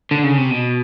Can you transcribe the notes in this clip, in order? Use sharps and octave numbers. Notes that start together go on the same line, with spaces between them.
D3
C#3
C3
B2